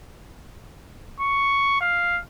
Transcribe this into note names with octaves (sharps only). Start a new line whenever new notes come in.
C#6
F5